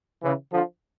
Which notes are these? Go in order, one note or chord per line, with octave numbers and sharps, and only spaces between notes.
C#3 E3
D3 F3